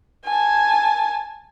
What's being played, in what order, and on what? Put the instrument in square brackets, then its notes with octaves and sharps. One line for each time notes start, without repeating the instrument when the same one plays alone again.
[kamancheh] G#5 A5